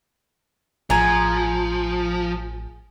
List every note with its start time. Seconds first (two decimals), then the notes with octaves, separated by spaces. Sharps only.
0.90 A1 F3 G#4 G#5 A#5